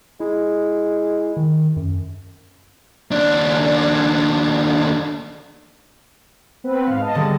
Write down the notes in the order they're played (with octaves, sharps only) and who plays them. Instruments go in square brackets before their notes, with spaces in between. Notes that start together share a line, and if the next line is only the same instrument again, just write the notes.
[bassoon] G#3 [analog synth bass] E4
[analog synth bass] D#3
F#2
[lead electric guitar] D#2 D4
[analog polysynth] B3 C4 B4
[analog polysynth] G#2 F5 [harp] B3
[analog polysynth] D#5 A5
[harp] D3 G3 G#4